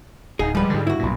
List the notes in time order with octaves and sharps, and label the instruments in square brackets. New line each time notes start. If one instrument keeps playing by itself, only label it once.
[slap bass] D1 [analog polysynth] D#4 [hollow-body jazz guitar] G#4
[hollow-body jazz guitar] F3 B4 [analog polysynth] G3 G#3
[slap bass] G#2 D3
[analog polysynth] G2 [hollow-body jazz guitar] E4 F#4
[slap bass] B1 A#2